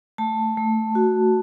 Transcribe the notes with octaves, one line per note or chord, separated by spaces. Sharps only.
A3 A5
A3
F#4